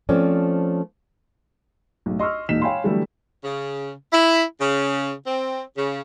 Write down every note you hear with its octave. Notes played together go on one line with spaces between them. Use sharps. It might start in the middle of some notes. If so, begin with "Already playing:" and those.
F3 A3 C4 C#4 D5
B1 A2
D#5 C6 C#6 E6 F6
E1 A#2 D#4 B6 E7
C#5 F5 G5 G#5 B5 C6
D3 E3 F#3 G3 A3 E4
C#3
E4
C#3
C4
C#3